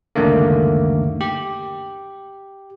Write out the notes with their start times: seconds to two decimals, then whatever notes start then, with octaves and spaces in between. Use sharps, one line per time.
0.15 C#2 F#2 D3 D#3 A3 A#3
1.21 G4